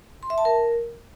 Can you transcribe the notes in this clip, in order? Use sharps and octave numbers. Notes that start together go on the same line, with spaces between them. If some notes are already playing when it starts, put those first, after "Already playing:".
C6
E5
A5
A#4